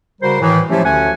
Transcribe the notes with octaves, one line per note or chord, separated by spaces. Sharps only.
C#3 G3 F#4 A#4 C5
A2 D#3 E3
F3 F#3 A3 C#4 E4 G4
D2 D3 A3 C#4 F#5 G#5